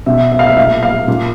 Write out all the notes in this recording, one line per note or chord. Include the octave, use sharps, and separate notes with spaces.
B2 E5
E5
F5
E5
A#2 F5
F5
A#2